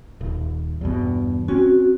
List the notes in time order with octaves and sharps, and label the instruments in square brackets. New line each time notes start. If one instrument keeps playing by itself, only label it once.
[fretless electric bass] D#1
E2 G2 B2
[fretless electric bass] C4 C#4 [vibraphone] F#4